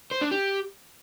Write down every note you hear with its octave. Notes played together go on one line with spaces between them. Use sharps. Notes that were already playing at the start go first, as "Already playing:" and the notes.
C5
D4
G4